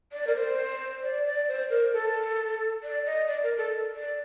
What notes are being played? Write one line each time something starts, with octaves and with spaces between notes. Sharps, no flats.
D5
A#4
C5
D5
D5
C5
A#4
A4
D5
D#5
D5
A#4
A4
D5